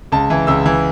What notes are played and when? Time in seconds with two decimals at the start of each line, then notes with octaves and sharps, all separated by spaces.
0.12 C#2 A5
0.30 E3
0.47 C#2 E6
0.66 E3